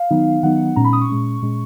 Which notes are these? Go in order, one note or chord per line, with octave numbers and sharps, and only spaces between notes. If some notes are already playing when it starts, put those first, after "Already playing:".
Already playing: F5
D#3 F#3 B3 D#4
D#3 F#3 B3 D#4 F#5
A#2 G#3 C#4 A#5
B5
D#6
C#6
A#2 G#3 C#4
A#2 G#3 C#4